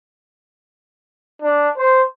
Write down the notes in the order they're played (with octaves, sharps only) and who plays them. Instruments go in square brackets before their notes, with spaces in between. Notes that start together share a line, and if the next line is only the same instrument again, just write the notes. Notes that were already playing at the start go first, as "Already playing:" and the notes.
[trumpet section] D4
C5